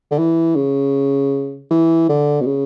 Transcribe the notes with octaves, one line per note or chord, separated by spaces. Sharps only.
D3
E3
C#3
E3
D3
B2
C#3